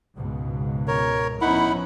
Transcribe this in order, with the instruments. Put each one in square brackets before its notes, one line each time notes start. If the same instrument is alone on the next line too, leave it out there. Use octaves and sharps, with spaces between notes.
[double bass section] C#2 G#2 B2
[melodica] A#4 C#5
[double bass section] F3 B3 C#4 [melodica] D#4 F#5 B5 [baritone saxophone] E4